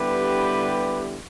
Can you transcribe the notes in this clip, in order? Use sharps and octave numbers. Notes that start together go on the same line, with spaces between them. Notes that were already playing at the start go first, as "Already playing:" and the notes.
Already playing: D3 G3 B3 E4 G4 B4